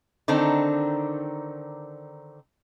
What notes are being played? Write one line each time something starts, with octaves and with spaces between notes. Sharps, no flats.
D3 D#3 C4 D4 D#4